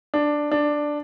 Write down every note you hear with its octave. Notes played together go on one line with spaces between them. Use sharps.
D4
D4